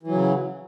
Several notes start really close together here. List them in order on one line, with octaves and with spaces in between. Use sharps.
E3 F#3 C#3